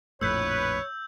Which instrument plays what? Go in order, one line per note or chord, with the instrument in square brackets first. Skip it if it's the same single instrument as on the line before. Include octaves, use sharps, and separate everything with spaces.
[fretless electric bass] A#1 F2 A2 [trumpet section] B4 [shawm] C#5 [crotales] E6 G6